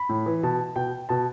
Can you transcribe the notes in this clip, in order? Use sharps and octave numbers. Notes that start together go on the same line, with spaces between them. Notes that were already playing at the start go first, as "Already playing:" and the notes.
Already playing: B5
A2
E3
B2 A5
B2 G5
B2 A5